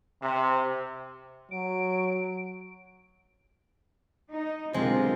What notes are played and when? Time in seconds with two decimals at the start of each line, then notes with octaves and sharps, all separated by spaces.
0.22 C3
1.51 F#3 D7
4.30 D#4
4.74 B1 D3 G#3 C4 F4 G4 A#4